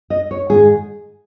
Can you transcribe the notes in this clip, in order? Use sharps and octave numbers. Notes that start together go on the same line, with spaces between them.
D#5
C#5
G#2 D#3 G#4